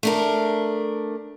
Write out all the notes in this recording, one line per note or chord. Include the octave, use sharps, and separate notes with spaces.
A3 D4 A#4